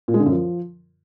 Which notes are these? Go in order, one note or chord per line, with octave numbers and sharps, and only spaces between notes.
A#2
G#3
D3
F#2
F3